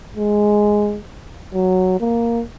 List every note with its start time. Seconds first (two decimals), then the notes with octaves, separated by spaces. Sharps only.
0.16 G#3
1.54 F#3
2.00 A#3